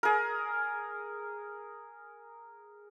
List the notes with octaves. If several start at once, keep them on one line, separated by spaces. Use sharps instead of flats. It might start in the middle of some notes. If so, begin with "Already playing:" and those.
G#4 A#4